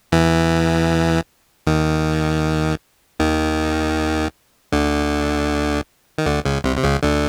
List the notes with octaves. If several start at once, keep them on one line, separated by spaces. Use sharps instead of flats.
E2 E3
D#2 D#3
D#2 D#3
D2 D3
D#3
D2 D3
C#2 C#3
C2 C3
C3
C#2 C#3
D2 D3